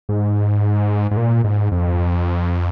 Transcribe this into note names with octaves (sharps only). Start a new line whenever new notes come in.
G#2
G#2
A#2
G#2
F2